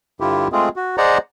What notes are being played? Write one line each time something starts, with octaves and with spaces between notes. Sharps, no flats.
G2 D3 E4 F4 G4
G#3 A3 C4 F4 G#4
F#4
G#4 C5 D5 D#5 F#5 A#5